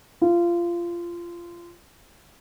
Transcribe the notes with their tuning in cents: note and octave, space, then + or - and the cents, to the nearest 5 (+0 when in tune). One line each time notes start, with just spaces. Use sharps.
F4 -20